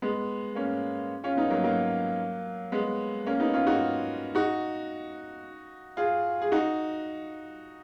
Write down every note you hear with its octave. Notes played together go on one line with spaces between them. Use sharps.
G#3 B3
A#3 C#4
C#4 F4
B3 D#4
F#3 A#3
F#3 A#3
G#3 B3
A#3 C#4
B3 D#4
C#4 F4
D#4 F#4
D#4 F#4
F4 G#4
G#4
D#4 F#4